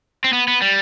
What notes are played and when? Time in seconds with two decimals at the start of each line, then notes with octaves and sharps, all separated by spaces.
0.24 C4
0.33 B3
0.48 B3
0.62 G3